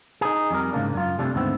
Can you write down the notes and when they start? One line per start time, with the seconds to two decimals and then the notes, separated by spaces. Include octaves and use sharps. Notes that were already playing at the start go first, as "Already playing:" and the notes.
0.21 D#4 G#4
0.51 F2 G3 A#4
0.73 G#2 C#3 A#3 D4
0.94 F#2 F4
1.19 C3 F3 G3 A3 D4
1.35 D#2 G#2 D3 A3 B3 C4